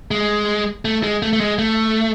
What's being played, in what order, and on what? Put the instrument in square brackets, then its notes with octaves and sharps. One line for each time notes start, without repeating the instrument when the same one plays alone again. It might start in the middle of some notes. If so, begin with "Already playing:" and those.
[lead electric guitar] G#3
A3
G#3
A3
A3
G#3
A3